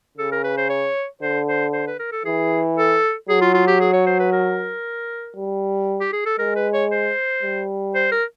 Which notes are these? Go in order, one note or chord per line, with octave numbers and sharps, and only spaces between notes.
C#3 A4
A#4
B4
C5
C#5
D3 C5
C5
C5
B4
A#4
A4
E3 G#4
A4
F#3 G#4
F4
F4
G4
G#4
C#5
C5
B4
A#4
G3
G4
G#4
A4
G#3 A#4
B4
C#5
C5
G3
C5
A#4